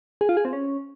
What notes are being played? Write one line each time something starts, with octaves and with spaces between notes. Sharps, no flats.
G#4
F4
G#4
C4
C#4